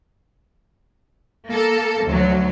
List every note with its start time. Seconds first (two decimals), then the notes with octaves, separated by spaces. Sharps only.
1.48 A#3 A4
2.03 D2 F#3